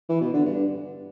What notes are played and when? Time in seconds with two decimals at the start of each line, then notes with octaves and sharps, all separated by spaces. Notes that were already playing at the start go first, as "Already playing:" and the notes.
0.09 E3
0.21 B2
0.33 D3
0.45 G2